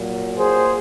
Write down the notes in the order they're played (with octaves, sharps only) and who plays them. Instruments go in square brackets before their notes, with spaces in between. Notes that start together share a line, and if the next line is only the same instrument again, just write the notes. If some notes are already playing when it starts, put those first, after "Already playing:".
Already playing: [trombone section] A#2 F#3
G#4 C5